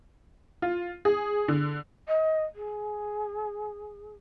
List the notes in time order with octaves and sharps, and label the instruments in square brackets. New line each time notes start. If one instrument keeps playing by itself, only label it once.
[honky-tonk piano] F4
G#4
D3
[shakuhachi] D#5
G#4